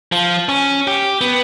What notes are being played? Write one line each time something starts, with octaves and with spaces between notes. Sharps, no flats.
F3
C#4
G4
B3